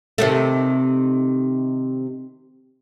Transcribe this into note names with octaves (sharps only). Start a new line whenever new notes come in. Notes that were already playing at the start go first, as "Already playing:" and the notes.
C3 D#3 A3